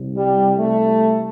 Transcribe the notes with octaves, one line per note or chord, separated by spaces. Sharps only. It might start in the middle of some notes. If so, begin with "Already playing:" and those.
Already playing: C2 C3
G3
A3